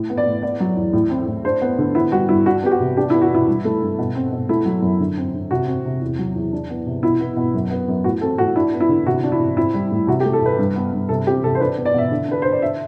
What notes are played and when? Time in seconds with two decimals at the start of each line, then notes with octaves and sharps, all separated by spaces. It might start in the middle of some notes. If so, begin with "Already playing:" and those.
Already playing: A2
0.10 B3
0.17 D5
0.26 A2
0.43 B3 D5
0.60 F#3
0.77 E2
0.93 A2
1.10 C4
1.27 A2
1.45 D4 C5
1.61 B3
1.79 D3
1.95 B3 E4
2.12 G3 F#4
2.28 G2 E4
2.46 D4 F#4
2.63 B3 G4
2.72 F#4
2.80 C3
2.97 D4 G4
3.10 E4
3.14 B3
3.22 F#4
3.31 B2 E4
3.48 G2
3.65 A3
3.81 G2
3.98 B2
4.15 C4
4.32 B2
4.49 A3 E4
4.65 F#3
4.82 F#2
5.00 D3
5.17 C4
5.34 D3
5.51 C3 F#4
5.67 C4
5.85 C3
6.01 E2
6.19 F#3
6.35 E2
6.52 D4
6.70 B3
6.86 C3
7.03 B2 E4
7.20 B3
7.37 B2
7.54 F#2
7.71 B3
7.88 F#2
8.04 A2 F#4
8.21 C4 A4
8.38 A2 F#4
8.55 D4 E4
8.73 B3
8.80 E4
8.89 D3
9.06 C3 F#4
9.23 D4
9.32 E4
9.40 C3
9.57 C4 E4
9.74 G3
9.91 A2
10.07 C3 F#4
10.20 G4
10.25 A3
10.33 A4
10.42 C3 B4
10.59 G2
10.76 B3
10.93 G2
11.09 C3 A4
11.27 C4 G4
11.44 C3 A4
11.55 C5
11.60 D4 B4
11.77 B3
11.85 D5
11.94 B2 E5
12.11 D3
12.28 D4 B4
12.42 D3 C5
12.52 D5
12.62 D4 E5